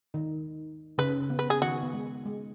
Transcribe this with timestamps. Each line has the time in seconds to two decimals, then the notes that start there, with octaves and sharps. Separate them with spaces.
0.14 D#3 D#4
0.98 C#3 C#4 B4
1.30 B3
1.39 B4
1.50 G#4
1.62 D#3 F#4
1.83 B3
1.93 G#3
2.26 G#3